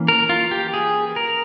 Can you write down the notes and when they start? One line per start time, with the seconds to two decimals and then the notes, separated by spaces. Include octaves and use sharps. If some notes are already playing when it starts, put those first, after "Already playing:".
Already playing: E3 A#3 C#4
0.08 A#4
0.29 F4
0.51 G4
0.74 G#4
1.16 A#4